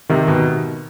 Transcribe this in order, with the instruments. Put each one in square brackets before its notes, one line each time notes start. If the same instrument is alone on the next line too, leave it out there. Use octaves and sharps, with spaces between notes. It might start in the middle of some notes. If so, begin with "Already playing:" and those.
[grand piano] C3 [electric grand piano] D#3
[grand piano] B2